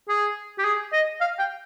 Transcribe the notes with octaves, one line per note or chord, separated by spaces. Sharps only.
G#4
G4
G#4
D#5
F5
G5